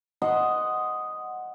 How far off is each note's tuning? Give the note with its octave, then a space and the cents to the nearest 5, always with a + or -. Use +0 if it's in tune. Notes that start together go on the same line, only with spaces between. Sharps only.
D#5 +0 F#5 +0 C6 +0